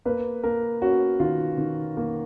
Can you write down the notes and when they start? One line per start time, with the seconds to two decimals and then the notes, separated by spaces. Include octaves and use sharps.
0.05 A#3 B4
0.44 A#3 A#4
0.82 C#4 F#4
1.20 D#3 F4
1.58 D#3
1.97 A#3